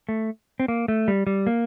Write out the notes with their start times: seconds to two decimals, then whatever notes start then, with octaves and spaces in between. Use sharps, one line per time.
0.09 A3
0.60 C4
0.68 A#3
0.88 A3
1.08 G3
1.27 G3
1.47 A#3